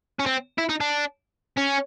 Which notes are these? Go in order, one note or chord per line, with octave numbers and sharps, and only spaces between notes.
C#4
C4
E4
D#4
D4
C#4